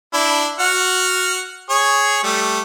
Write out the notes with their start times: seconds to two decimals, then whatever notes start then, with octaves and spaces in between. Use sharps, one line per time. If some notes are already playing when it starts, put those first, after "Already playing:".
0.13 D4 E4
0.59 F#4 F#5 F6
1.70 G#4 C#5
2.23 G3 A3